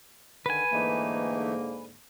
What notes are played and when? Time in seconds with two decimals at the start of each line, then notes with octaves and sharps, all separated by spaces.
0.46 D3 D#3 B4 G#5
0.72 G#2 D3 E3 A3 A#3 D#4